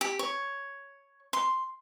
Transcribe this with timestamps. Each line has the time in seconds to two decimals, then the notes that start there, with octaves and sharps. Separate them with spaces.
0.01 G4
0.19 C#5
1.33 C6